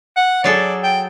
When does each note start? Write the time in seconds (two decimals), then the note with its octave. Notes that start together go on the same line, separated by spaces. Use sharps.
0.17 F#5
0.44 F#3 G#4 A4 D5
0.83 G5